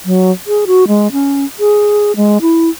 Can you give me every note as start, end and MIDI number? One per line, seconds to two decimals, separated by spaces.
0.05 0.31 54
0.47 0.65 68
0.67 0.88 66
0.88 1.11 56
1.12 1.45 61
1.59 2.15 68
2.16 2.38 56
2.41 2.69 64